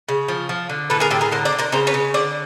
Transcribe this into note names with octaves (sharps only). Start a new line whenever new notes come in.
C#3
F3
F3
D3
A2 A4 B4
G#4 A#4
A2 G4 A4
G#4 A#4
D3 A#4 C5
C5 D5
D3
A#4 C5
C#3 A#4 C5
B4 C#5
C#3
D3 C5 D5